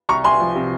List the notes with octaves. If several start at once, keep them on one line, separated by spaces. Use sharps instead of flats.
C2 A#5 C#6
C2 G#5 C6
F3
C3